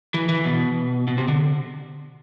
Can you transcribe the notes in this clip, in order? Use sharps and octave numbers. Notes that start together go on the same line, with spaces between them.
E3
E3
B2
B2
C3
D3